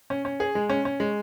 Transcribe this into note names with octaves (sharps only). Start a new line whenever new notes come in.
C#4
C#4
G#4
G#3
C#4
C#4
G#3